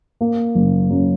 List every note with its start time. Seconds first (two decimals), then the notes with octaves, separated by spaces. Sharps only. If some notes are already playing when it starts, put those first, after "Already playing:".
0.21 A#3
0.55 F#1
0.90 F#2